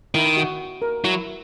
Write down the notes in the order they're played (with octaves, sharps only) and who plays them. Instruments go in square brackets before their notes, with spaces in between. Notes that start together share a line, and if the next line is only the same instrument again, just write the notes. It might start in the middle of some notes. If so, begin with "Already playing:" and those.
[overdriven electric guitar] D#3 [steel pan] E4
[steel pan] F#4
A#4
[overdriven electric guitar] F#3 [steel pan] E4